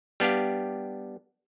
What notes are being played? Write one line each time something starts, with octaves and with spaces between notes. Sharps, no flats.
G3 B3 D4 G4 F5